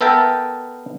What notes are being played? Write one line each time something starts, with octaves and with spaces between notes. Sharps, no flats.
B3 A4 A#4 E5 G5 A5